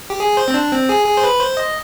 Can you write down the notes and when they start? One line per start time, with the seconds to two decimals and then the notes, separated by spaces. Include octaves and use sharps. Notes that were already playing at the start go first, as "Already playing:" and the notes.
0.10 G4
0.20 G#4
0.37 C5
0.48 C4
0.54 D4
0.71 C4
0.89 G#4
1.06 G#4
1.17 C5
1.24 B4
1.40 C5
1.57 D#5